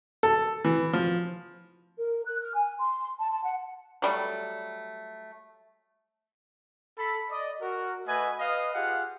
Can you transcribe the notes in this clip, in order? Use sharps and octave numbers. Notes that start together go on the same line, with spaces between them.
A4
E3
F3
A#4
F#6
F6
G#5
C6
A5
A5
F#5
F#3 G3 A3
A4 B5
D5 D#5
F#4 A#4
A3 F#4 B4 D#5 E5 G#5
B4 D#5 F5
F4 G4 G#4 F5 F#5